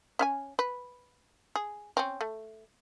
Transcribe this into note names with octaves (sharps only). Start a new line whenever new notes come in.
C#4 F5 G#5
B4
G#4
C4 C#4
A3